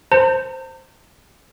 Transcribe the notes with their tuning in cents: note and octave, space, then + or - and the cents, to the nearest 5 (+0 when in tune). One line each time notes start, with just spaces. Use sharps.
C5 +0 A#5 -45